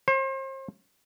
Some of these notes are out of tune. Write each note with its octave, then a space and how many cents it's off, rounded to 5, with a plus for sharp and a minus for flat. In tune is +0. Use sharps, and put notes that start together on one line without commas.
C5 +40